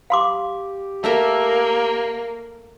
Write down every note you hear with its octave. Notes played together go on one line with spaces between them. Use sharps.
G4 F5 C6 D6
A3 A#3 A#4 E5